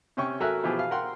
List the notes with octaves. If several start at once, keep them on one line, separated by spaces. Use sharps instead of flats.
C3 C#4 G5 C#6
F#3 A4 A#4 E5 G#5 F#6
B2 E3 F3 G4 G#4
F5
A#4 F#5 G5 C6